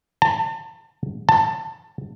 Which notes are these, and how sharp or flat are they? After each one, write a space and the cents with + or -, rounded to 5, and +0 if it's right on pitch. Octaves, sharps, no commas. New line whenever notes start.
A5 +35
A5 +20